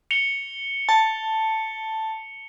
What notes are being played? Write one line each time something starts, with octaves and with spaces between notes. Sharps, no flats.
C#7 F7 G7
A5